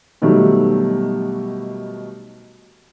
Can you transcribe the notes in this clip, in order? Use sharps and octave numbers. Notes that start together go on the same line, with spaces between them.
B2 D#3 F#3 G3 A3